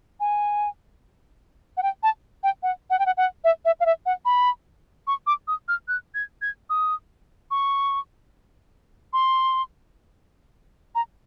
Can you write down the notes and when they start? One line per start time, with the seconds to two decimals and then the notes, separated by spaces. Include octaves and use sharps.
0.20 G#5
1.77 F#5
1.83 G5
2.03 A5
2.43 G5
2.63 F#5
2.90 F#5
2.99 G5
3.06 F#5
3.17 F#5
3.44 E5
3.65 E5
3.80 F5
3.86 E5
4.06 F#5
4.25 B5
5.07 C#6
5.27 D6
5.48 D#6
5.68 F6
5.88 F#6
6.15 G#6
6.42 G#6
6.70 D#6
7.51 C#6
9.13 C6
10.95 A#5